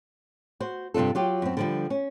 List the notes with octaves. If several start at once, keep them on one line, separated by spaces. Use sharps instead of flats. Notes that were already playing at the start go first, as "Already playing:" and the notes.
F#4 C5
G2 C3 D4 F4 A4
F#3 F4 G4
F#2 C4
D3 F3 G3
C#4